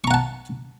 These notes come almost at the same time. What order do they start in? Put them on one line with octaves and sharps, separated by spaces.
C#6 A#5 F#5 A5